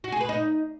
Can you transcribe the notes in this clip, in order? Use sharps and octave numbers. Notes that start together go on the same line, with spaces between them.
F#4
G#4
B4
D#4